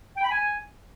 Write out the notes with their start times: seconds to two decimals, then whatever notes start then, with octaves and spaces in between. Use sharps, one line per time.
0.18 G5
0.24 B5
0.31 G#5